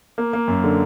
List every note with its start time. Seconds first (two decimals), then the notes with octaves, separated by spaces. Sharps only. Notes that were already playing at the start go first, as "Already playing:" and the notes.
0.18 A#3
0.33 A#3
0.48 F#2
0.64 D3